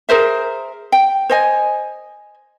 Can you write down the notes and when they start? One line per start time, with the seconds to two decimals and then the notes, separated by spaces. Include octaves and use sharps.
0.09 G#4 A#4 C5 E5
0.92 G5
1.30 C5 D#5 G#5